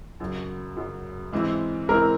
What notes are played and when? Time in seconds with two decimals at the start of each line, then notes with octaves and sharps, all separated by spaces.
0.20 F#2 C#3 F#3
0.76 F#2 C#3 F#3
1.33 G#2 E3 G#3 C4 E4
1.88 G#2 E3 G#3 C4 E4 A#4